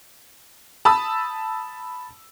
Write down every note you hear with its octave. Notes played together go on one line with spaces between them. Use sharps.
A5 B5 D#6 E6